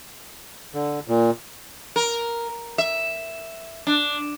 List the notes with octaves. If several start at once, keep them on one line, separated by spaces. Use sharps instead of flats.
D3
A#2
A#4
E5
D4